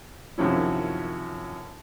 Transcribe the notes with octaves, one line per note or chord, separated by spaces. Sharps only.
F#2 C3 D#3 F3 C#4 E4